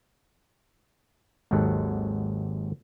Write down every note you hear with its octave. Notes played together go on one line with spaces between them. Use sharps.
G#1 D#2 G#2 F#3 A4 F#5